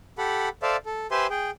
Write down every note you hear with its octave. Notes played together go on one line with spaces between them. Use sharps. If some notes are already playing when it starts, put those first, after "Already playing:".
G4 A4 F#5 B5
A4 C5 D5 E5 F5
A4
G4 B4 C5 E5 G#5 C6
G#4 G5